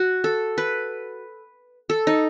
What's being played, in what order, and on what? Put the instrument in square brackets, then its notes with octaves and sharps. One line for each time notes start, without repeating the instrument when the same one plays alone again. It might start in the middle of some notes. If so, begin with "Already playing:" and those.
Already playing: [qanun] F#4
A4
B4
A4
D#4